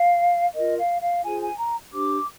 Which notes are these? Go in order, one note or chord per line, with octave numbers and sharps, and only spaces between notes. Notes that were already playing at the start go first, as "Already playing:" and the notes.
Already playing: F5
F4 A#4 D#5
F5
F5
F4 G#4 C5 G#5
G#5
A#5
D4 G4 C5 D6